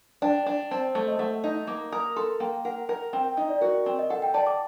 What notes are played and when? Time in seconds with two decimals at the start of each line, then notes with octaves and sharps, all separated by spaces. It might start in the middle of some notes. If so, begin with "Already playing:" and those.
0.22 D4 G5
0.46 D4
0.71 C4 A5
0.95 A3
1.08 D#5
1.19 A3 F#5
1.44 D#4
1.67 A#3 D6
1.92 A#4 D#6
2.16 A4 C6
2.40 A#3 G5
2.65 A#4 F#5
2.89 A#4
3.13 C4 G5
3.25 G5
3.37 D#4 D#5
3.49 D5
3.61 F#4 A#4
3.86 C4
3.99 D#5
4.10 A4 F#5
4.22 G5
4.34 D5 A5
4.47 D6